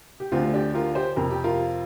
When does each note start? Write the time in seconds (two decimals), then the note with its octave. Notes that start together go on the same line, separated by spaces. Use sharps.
0.20 G4
0.32 D2 D3 C4 F4
0.54 D4 G4
0.74 F4 A#4
0.95 G4 C5
1.16 F2 C3 A#4
1.30 G4
1.44 F4 A#4